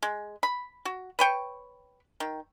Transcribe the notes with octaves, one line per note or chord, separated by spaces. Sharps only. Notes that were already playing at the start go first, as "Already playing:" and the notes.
G#3
B5
F#4
B4 C#5 G5 C#6
D#3